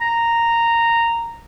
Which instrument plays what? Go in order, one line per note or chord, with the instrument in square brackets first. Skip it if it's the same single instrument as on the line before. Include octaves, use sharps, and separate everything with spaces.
[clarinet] A#5